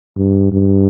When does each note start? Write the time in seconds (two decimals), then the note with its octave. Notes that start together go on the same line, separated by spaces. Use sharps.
0.17 G2
0.52 G2